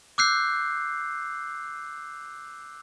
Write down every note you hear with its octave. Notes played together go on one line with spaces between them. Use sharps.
D6 E6 F#6 G6 C7